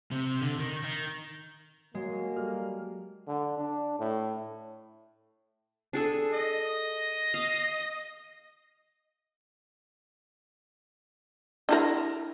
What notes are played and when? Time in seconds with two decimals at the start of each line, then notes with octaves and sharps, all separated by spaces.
0.11 C3
0.42 D3
0.59 D#3
0.84 D#3
1.95 F#3 G#3 A#3
2.35 F#3 G3 A4 F6
3.27 D3
3.57 D4
3.99 A2
5.93 D4 G#4 A4
6.33 D#5
7.34 F5
11.69 D4 E4 A#4